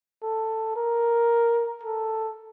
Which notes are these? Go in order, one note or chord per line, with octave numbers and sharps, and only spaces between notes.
A4
A#4
A4